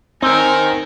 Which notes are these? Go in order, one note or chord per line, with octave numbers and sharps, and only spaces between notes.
C4 D#4 A#4 G#5